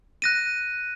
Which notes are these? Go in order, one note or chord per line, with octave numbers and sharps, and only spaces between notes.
F#6 A#6 D#7